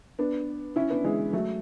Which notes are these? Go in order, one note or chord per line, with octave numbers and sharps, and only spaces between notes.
B3 D4
C#4 E4
B3 D4
E3 G#3
F#3 A3